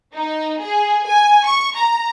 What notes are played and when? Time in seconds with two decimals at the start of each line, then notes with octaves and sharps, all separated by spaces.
0.13 D#4
0.60 G#4
1.06 G#5
1.45 C#6
1.75 A#5